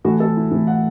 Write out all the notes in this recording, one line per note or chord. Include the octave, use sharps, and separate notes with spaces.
A2 E3 A3 F#4
A4
E4
A2 E3 A3 E4
F#5